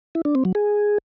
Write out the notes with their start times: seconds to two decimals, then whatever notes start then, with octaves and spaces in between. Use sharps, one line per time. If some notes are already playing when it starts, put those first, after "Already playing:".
0.15 E4
0.25 D4
0.35 C4
0.45 F#3
0.55 G#4